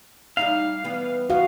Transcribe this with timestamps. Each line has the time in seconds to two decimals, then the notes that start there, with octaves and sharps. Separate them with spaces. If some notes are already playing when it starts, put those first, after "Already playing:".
0.37 G3 D#4 E4 F5
0.84 E3 G3 B3
1.30 E3 B3 F#4 F5